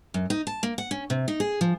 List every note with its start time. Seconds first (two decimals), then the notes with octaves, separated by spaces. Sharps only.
0.14 F#2
0.30 D#4
0.47 A5
0.63 A#3
0.78 F#5
0.91 C#4
1.10 C3
1.28 D#4
1.40 G#4
1.61 F3